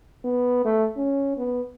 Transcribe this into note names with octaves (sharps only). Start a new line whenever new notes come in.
B3
A3
C#4
B3